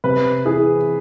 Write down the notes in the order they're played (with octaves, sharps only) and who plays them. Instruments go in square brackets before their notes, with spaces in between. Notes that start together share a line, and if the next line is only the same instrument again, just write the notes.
[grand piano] C3 [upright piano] B4
[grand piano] E3 [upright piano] G#4